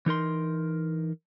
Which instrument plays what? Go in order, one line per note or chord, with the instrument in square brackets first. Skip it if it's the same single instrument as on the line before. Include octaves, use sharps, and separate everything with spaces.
[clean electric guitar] E3 D#4 A#4 C6